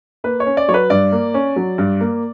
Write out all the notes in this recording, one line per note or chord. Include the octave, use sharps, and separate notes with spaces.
A#3 B4
C#5
C#4
D5
F#3 C#5
B4
G2 D5
A#3
C#4
F#3
G2
A#3